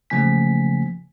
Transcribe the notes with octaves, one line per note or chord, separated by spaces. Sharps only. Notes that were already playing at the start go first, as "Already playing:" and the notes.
C#3 F3 A3 A#3 G#5 B6